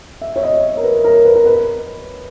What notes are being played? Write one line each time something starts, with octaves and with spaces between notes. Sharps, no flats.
E5
C#5
D#5
A#4
B4
A#4
B4
A#4
B4